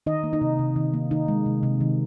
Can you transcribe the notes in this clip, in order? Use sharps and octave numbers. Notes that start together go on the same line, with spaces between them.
D#3 D#4 D#5
A#3
D#4
C3
C3
D#3
A#3
D#3 D#4
G#3
C3
C3
D#3